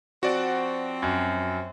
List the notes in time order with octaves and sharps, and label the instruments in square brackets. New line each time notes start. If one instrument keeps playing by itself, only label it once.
[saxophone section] F3 C4 [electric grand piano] F#4 D5 F#5
[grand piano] F#2